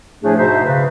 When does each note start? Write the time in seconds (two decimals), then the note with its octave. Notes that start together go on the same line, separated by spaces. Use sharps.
0.23 A2 F3 A3 D4 G#4
0.38 G#2 B2 D#4 C5 E5
0.64 C#3 B4